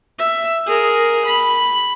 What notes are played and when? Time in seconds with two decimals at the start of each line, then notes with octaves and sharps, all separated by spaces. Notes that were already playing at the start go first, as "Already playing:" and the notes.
0.19 E5
0.67 G#4 A#4
1.26 B5